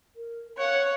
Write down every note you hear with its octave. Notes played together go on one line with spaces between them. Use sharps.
A#4
C#5 F5 F#5